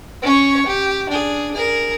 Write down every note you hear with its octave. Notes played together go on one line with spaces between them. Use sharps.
C#4 C#5
G4
D4 G#4
G#4 A#4